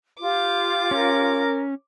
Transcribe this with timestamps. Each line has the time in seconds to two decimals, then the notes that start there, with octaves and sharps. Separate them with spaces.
0.21 F4 G4 D6
0.91 C#4 A#4